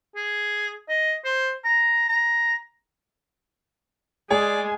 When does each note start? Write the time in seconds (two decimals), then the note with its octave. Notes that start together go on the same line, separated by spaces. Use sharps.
0.16 G#4
0.89 D#5
1.25 C5
1.64 A#5
2.09 A#5
4.31 G#3 G#4 D5 G#5